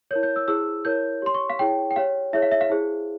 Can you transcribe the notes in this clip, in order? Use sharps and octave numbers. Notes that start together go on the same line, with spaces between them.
E4 A#4 C#5 G6
G6
E6
E4 G#4 C5 E6
E4 A#4 C#5 G6
G4 C#5 C6
C#6
F5
E4 G#4 C#5 G5
G5
G4 C#5 F5
E4 G#4 C#5 E5
F5
E5
F5
E4 G#4 C5